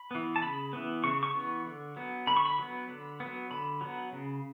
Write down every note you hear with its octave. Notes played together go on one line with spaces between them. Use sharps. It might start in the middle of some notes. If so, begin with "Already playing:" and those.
Already playing: B5
E3 B3
A5
C#3 B5
E3 B3
C#3 C#6
C#6
E3 B3
D3
F#3 B3
D3 B5
C#6
B5
F#3 B3
D3
F#3 B3
D3 B5
F#3 B3
C#3